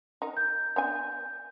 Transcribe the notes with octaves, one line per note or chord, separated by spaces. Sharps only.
D#4 A#4
G6
B3 D4 G#5